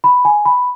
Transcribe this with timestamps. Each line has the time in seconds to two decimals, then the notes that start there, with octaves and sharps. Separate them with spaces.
0.04 B5
0.25 G#5
0.45 B5